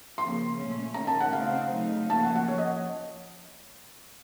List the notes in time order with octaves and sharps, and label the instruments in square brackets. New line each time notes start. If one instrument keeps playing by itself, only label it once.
[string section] C#3 F3 A#3 [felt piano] C6
[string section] A#2 A3 C#4
[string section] D#3 A3 C#4 [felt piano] A#5
[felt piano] A5
F#5
[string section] C#3 A3 C4 D#4 [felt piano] F5
[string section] C#3 F#3 A3 D#4
[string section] F3 A#3 C#4 [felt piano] A5
[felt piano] F#5
F#5
[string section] F3 [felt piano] C#5
[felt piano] D#5